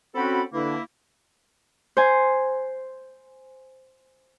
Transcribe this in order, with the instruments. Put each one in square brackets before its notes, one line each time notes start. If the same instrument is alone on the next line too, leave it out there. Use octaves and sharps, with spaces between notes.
[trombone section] C4 C#4 F#4 [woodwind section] A4 G5 B5
[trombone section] D3 B4 [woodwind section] A#3 E4
[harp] C5 G#5